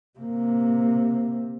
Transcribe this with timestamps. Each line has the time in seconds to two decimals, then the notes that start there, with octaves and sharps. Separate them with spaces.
0.19 C3 A#3